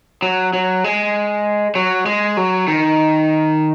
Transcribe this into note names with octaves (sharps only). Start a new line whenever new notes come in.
F#3
F#3
G#3
F#3
G#3
F#3
D#3